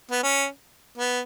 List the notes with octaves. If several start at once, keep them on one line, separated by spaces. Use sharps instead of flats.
B3
C#4
B3